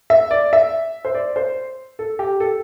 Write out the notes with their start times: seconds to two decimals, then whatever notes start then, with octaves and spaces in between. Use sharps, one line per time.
0.10 E5
0.31 D5
0.53 E5
1.05 C5
1.14 D5
1.36 C5
1.99 A4
2.19 G4
2.40 A4